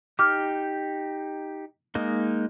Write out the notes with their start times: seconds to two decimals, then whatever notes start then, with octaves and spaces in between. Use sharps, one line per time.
0.19 D#4 G4 D6 F6
1.95 G#3 A#3 D#4